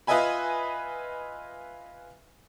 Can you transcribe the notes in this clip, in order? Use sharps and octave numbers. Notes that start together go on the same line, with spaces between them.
F4 B4 D#5 E5 G#5 B5